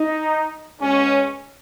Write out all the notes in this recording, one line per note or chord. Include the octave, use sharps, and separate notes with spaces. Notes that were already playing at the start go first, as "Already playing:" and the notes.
Already playing: D#4
B2 G#3 C#4